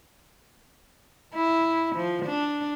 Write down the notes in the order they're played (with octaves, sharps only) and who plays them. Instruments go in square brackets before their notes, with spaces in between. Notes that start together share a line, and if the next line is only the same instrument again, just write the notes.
[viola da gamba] E4
F3
D4